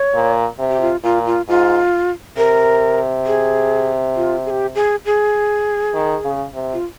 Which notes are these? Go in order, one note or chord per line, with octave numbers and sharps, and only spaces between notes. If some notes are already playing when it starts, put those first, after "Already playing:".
Already playing: C#5
A#2
C3
G4
F4
A#2 F4
F4
G#2 F4
C3 A#4
G#4
F4
G#4
G4
G#4
G#4
D#3
C#3
C3
F4